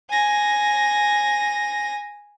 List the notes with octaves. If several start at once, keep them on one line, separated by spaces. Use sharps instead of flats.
G#5 A#6